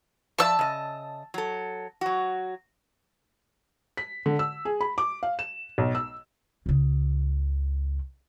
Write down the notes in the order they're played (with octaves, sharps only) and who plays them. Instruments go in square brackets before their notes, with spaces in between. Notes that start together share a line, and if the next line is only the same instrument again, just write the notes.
[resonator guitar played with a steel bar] F3 D5 E5 [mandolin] A5 E6
[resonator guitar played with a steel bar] C#3 D#5
F#3 A4
F#3 F#4
[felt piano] B6
D3
E6
G#4
B5
D6
F5
E7
B1
E6
[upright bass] C#2 C#3